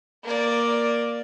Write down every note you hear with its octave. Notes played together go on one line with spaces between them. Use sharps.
A#3 D5